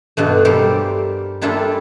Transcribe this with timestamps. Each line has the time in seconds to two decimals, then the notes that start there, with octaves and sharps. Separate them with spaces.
0.17 G2 B2 A3
0.45 G3 A#3 G4 A4 C5
1.42 G3 A#3 D4 E4 F4 A4